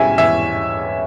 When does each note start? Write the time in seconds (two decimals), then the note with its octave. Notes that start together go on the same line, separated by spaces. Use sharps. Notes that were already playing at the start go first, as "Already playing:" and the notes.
Already playing: E2 B2 G3 C#4 E4 E5 G#5
0.18 E2 E5 G#5